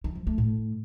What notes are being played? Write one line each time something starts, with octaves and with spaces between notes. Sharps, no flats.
D#3
F3
A3
A2